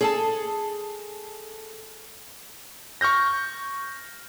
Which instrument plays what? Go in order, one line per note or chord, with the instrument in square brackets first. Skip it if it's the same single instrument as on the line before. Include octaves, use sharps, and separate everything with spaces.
[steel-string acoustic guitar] G#4 A4 A5
[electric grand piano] C#6 F6 G6 A#6